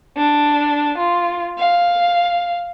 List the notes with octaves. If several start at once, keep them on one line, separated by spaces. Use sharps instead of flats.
D4
F4
F5